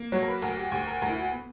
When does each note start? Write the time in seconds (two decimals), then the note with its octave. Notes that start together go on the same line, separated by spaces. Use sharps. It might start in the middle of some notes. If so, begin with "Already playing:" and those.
Already playing: A#3
0.12 F#3 C#5
0.22 A#4
0.28 B4
0.42 D2 A#4
0.57 G4
0.72 D2 G4
0.87 A#4
1.02 D2 A#4
1.09 E4
1.17 F#4
1.32 B3